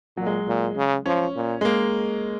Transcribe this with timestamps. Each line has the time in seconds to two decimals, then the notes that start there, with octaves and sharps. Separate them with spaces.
0.17 A#2 F#3
0.26 G#3
0.47 A#2
0.76 C#3
1.06 F3 C#4
1.35 A#2
1.61 G#3
1.65 A#3